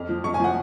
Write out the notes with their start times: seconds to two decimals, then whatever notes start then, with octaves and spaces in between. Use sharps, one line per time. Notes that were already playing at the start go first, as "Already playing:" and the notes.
Already playing: F2 F6
0.09 F3
0.24 F2 C#6
0.34 G#5
0.40 F3 F#5